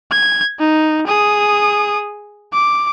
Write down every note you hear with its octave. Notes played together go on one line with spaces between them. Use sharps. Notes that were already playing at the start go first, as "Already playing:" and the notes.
G#6
D#4
G#4 D#6
D6